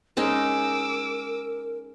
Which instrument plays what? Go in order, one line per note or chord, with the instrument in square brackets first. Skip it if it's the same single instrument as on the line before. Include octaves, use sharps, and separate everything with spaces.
[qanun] G#3 C#4 D#4 [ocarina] A#4 [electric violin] D6 E6